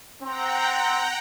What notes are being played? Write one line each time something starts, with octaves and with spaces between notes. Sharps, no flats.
C4 F#5 G5 A#5